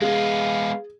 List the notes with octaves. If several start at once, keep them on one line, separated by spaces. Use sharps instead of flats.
G#3 B3 G#4 F5